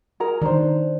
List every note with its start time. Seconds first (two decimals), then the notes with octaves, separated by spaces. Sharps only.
0.20 G#4 A#4 A#5
0.42 D#3 D4 C5